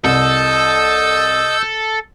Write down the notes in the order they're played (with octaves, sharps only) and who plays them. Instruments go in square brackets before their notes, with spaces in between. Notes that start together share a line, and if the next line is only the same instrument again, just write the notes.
[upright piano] C2 [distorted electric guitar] A4 [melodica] D#5 [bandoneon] E6 G6